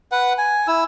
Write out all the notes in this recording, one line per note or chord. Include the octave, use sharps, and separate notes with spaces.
B4 F#5
G#5
E4 E6